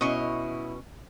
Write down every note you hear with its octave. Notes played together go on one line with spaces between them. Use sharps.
B2 C#4 E4 D#5 C#6